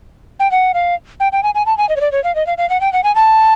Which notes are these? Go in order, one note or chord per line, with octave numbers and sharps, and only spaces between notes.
G5
F#5
F5
G5
G5
G#5
G#5
A5
G#5
D#5
C#5
D5
C#5
F5
D#5
F5
F5
F#5
G5
F#5
G#5
A5